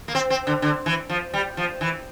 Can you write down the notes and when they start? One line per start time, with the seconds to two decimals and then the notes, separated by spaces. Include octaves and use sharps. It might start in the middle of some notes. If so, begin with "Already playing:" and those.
0.08 A#3
0.15 C4
0.30 C4
0.47 D3
0.62 D3
0.86 E3
1.10 F3
1.33 G3
1.57 F3
1.81 E3